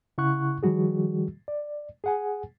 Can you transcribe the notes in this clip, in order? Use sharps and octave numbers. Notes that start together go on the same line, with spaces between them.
C#3 E4 F#5 C#6 F#6
D#3 F3 G3 F#4 G#4
D5
G#4 F#5 G#5